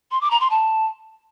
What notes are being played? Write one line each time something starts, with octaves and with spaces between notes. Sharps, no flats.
C6
D6
A#5
C6
A5